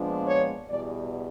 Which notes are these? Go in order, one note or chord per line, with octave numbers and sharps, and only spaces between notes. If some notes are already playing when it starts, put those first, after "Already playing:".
Already playing: A#2 F3 G#3 B3 D4
C#5
E2 B2 G3 D5